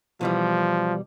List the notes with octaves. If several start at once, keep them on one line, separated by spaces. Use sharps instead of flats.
B2 E3 F3 G3